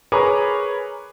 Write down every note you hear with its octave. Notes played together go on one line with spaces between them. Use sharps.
G#4 A#4 B4 C#5 D6